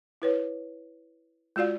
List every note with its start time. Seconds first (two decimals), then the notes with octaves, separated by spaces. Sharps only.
0.22 E4 B4 C#5
1.56 G#3 F4 F#4 D5 F5